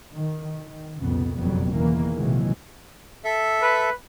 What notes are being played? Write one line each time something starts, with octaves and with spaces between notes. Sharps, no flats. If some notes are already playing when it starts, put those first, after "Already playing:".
D#3
D#3
C2 F2 A#2 C#3 B3
F#1 B1 F2 F#3 G3 B3
E2 D#3 E3 A#3
A#1 C3 D#3 E3 F#3 G#3
A4 E5
B4